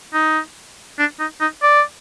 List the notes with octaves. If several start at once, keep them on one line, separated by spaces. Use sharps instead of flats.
D#4
D4
D#4
D#4
D5